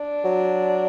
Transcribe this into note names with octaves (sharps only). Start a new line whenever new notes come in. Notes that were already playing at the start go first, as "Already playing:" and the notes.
Already playing: D4
F#3